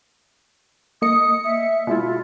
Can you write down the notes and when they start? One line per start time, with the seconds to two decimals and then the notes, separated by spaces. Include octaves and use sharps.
1.02 A#3 D#5 D#6 C#7
1.44 E5
1.87 B2 G#3 E4 F4